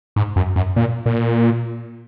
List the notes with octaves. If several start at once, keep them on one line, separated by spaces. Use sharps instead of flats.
G#2
F#2
F#2
A#2
A#2